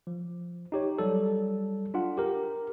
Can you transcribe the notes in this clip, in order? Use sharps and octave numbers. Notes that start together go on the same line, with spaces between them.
F3
D#4 G4 C#5
F#3 G3 A4
D4 F4 F#5
G4 A#4